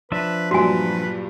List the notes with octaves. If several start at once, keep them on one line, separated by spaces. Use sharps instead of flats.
F3 D4 B4 E5
G2 A#2 F#3 F#4 B4 G#5